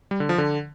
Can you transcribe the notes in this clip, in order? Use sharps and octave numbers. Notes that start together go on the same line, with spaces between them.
G3
D3
F3
D3